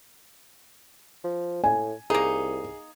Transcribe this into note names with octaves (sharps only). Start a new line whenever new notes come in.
F3
A2 G#5
C2 A#3 D#4 G#4